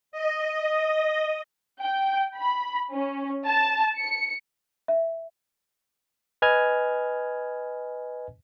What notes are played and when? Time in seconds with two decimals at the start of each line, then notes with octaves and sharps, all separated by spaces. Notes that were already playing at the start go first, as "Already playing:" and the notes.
0.12 D#5
1.81 G5
2.38 B5
2.91 C#4
3.45 A5
3.99 C#7
4.88 E5
6.42 B4 D#5 G#5 F6 G#6